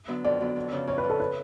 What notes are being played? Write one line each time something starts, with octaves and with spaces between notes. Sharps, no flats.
D3 F#3 B3
F2 D5
D3 F#3 B3
F2
C#3 F3
F2 C#5
B4
C#3 F3
A4
B4